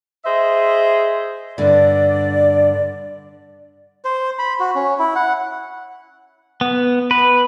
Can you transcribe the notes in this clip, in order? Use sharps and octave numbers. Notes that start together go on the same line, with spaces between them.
G#4 C5 D#5 E5
G2 D3 D5
C5
B5
F#4
C#4
E4
F#5
B3
B4